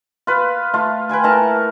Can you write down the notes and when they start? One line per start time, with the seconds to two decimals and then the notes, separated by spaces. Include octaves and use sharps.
0.27 F4 B4
0.74 A3 F4
1.09 B4 G5 G#5 B5
1.24 A3 E4 A#4 A5